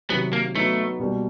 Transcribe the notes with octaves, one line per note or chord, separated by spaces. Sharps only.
C3 D#3 F#3 B3
A#3
F#3 A3 B3 D#4 F#4
B2 G3 A#3